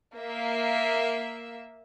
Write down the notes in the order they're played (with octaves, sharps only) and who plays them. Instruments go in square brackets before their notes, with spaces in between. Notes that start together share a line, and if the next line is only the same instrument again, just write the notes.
[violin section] A#3 E5